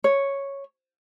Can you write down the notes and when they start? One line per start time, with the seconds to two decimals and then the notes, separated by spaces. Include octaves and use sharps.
0.04 C#5